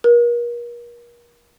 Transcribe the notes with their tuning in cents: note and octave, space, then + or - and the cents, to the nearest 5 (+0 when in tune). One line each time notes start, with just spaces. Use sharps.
A#4 +40